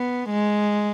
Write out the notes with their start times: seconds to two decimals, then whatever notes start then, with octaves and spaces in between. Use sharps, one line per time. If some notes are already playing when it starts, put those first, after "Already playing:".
Already playing: B3
0.30 G#3